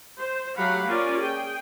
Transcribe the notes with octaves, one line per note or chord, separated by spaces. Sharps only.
C5
F#3 A3 G4 F5 F#5 B5
A#3 C#4 F4 D5
G#4 G5